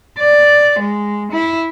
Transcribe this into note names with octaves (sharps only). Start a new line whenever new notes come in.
D5
G#3
E4